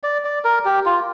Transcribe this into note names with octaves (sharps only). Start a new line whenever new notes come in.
D5
D5
A#4
G4
F4